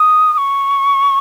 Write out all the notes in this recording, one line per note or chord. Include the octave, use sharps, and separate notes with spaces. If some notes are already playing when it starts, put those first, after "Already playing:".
Already playing: D#6
D#6
C#6